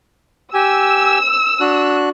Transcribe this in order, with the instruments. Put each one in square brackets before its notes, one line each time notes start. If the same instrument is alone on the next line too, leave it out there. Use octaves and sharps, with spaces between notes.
[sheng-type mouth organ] G4 G#5 [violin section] E6
[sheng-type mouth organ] D4 F#4 F#6